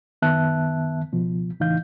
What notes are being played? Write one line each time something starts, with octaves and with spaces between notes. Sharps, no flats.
F#2 D#3 B3 E5 A5 F#6
C#2 B2 F3
C#2 A2 E3 D#4 F5 G6